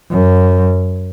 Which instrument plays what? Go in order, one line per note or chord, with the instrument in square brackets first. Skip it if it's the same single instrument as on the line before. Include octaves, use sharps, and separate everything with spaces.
[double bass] F#2